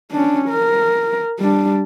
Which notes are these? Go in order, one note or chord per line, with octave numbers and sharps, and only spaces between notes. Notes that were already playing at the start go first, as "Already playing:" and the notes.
C#4 D4
A#4
G3 D4